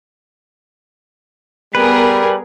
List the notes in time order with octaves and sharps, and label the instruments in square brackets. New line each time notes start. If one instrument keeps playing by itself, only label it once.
[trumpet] G3 [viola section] B3 [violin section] G#4 A#4 [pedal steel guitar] B4